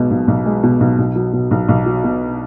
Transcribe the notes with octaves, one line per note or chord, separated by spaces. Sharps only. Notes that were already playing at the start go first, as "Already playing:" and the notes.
Already playing: B1 B2 G#3
B1
B1
G#3
B2
B1
B1
F#3
B2
B1
B1
F#3
B2